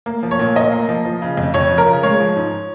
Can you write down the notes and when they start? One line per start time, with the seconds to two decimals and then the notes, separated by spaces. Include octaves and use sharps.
0.06 A#3
0.23 F3
0.31 C#5
0.39 A#2
0.56 A#2 D#5
0.72 A#3
0.88 F3
1.05 F3
1.22 C#3
1.37 F2
1.54 F2 C#5
1.70 F3
1.78 A#4
1.86 C#3
2.03 G#3 C#5
2.20 F3
2.36 G#2